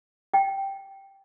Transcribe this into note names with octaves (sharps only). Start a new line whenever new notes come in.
G5